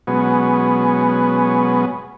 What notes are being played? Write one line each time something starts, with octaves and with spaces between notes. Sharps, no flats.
B2 F#3 G#3 B3 C#4